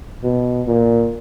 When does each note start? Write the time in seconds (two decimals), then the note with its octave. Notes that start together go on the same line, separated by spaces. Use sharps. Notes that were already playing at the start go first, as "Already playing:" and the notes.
0.23 B2
0.67 A#2